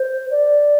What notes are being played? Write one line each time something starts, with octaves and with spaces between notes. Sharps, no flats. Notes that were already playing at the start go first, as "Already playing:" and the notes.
Already playing: C5
D5